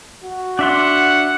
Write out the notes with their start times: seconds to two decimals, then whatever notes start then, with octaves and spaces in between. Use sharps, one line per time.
0.24 F#4
0.59 D4 E5 F#5 C6